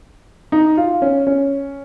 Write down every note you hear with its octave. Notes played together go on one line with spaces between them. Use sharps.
D#4
F4
C#4
C#4